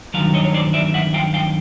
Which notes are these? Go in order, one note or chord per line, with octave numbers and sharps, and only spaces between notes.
G2 D#3 F#3 F5
C#5 D#5
C#5
C5 D5
D5 E5
E5 F#5
F5 G5
F5 G5